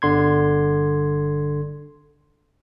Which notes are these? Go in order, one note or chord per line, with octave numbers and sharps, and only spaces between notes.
G1 D3 C6 G#6